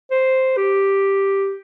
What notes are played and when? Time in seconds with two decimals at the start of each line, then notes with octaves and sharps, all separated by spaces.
0.11 C5
0.57 G4